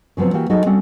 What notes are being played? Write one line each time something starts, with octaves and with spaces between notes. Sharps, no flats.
C#3 F3 F#3 B3 C4
E3 A#3 F#4 G4
F#3 D#4 F#4 G#4 A4 D#5
G3 C4 C#4 F#4 A4